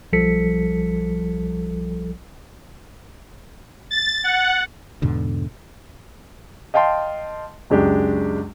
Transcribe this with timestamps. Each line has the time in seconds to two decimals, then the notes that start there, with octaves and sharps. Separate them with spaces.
0.13 B1 F3 G3 A4 B6 C#7
3.91 A6
4.24 F#5
5.02 E2 G#2 B2 D3
6.74 D#5 F5 G5 A5 C6
7.70 C#2 F#2 G#3 D4 G4